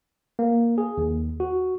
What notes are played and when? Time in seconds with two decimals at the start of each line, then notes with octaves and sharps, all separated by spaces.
0.39 A#3
0.78 G#4
0.98 D#2
1.40 F#4